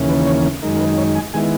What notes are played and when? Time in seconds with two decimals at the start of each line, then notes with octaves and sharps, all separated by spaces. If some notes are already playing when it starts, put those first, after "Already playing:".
Already playing: D#2 C#3 E3 A#3 C#4
0.09 B4
0.26 C#5
0.62 F#2 D#3 G#3 D#4 A#4
0.76 A#4
0.80 B4
0.98 C#5
1.15 G#5
1.34 D#3 G#3 B3 E4 G#5